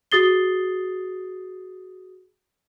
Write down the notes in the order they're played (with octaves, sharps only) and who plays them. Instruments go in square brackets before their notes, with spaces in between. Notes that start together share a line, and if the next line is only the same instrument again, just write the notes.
[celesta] F#4 G#4 D#6 A6 C7 G7